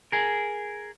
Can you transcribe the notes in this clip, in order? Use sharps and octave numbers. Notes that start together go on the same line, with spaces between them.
G#4 A#4